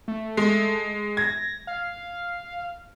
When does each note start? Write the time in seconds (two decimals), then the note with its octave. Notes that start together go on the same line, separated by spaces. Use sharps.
0.08 A3
0.37 G#3
1.17 G#6 A#6
1.67 F5